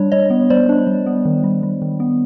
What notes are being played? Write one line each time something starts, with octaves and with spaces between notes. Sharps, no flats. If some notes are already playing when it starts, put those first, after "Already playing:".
Already playing: G3 D4 C#5
G3 C#5 D#5
B3
G3 C5 D5
D4
G3
B3
D#3
G3
G3
D#3
B3